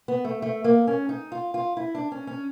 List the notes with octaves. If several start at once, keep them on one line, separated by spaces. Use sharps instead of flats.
B3
A3
A3
A#3
C#4
D#4
F4
F4
E4
D4
C#4
C#4